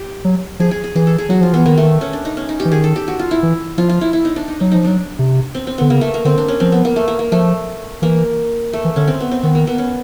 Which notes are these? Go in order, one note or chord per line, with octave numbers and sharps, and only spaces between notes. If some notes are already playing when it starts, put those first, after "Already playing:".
Already playing: G4
F#3
F3 G#4
G#4
G#4
E3 G#4
A4
G#4
F#3 F#4
F3 F4
E3 B3
D#3 A#3
A3
C#4
D4
D#4
C#4
D#4
G4
E3
D#3 G#4
A4
G4
F#4
F4
E4
E3
F3 F4
F4
E4
E4
D#4
D4
D#4
F#3 D#4
F3 D#4
F#3 D4
C3
C4
C4
D3 B3
C#3 A#3
A3
A#3
D3 C4
D4
C#4
F3 C4
B3
A#3
A3
A#3
A#3
F3 A3
E3 A#3
A3
E3
D3 C#4
C4
B3
C4
D#3 B3
A#3
B3
C#4